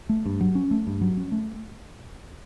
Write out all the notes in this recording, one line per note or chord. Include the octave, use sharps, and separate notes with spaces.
A3
G2
F#3
C#4
A3
G2
F#3
C#4
A3